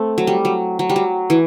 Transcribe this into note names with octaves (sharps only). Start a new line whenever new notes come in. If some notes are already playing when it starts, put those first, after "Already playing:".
Already playing: A3 C4
F#3
G3
F#3
F#3
G3
F#3
E3